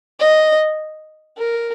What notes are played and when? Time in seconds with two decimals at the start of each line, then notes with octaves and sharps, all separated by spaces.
0.20 D#5
1.38 A#4